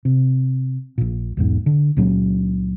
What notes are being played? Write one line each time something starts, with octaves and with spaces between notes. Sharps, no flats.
C3
A#1 A#2
B1 E2 G#2
D3
C#2 A#2 F#3 C#4